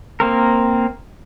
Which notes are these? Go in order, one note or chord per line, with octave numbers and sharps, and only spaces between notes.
A#3 C4 A#4